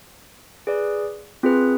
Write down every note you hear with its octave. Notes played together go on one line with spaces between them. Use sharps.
G#4 B4 D5
C4 F4 G#4 B4